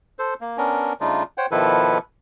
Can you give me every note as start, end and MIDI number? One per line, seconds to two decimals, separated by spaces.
0.19 0.34 69
0.19 0.34 72
0.41 0.57 58
0.57 0.93 59
0.57 0.93 61
0.57 0.93 62
0.57 0.93 70
1.01 1.23 49
1.01 1.23 55
1.01 1.23 57
1.01 1.23 62
1.01 1.23 63
1.01 1.23 65
1.38 1.46 72
1.38 1.46 73
1.38 1.46 78
1.38 1.46 79
1.51 1.98 47
1.51 1.98 51
1.51 1.98 53
1.51 1.98 64
1.51 1.98 69
1.51 1.98 71